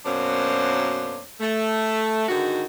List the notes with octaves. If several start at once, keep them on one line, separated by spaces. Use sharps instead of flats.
F#2 B2 A#3 D4 C5 C#5
A3
G#2 D3 D#3 F#4